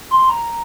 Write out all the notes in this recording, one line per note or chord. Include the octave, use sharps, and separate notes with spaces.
C6
A#5